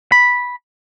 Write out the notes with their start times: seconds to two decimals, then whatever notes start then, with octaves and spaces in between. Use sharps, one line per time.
0.12 B5